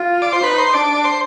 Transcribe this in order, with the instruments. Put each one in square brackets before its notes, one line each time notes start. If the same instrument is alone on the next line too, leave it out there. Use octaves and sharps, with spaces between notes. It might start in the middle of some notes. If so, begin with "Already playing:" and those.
Already playing: [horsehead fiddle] F4
[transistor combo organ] D5
C5
[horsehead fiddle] D#4 [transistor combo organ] B4
[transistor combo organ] C5
[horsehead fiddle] D4 [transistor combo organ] D5
[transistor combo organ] C5